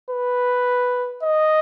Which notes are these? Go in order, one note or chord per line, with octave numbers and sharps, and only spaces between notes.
B4
D#5